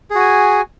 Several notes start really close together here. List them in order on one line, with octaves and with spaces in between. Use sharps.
G#4 F#4 G#5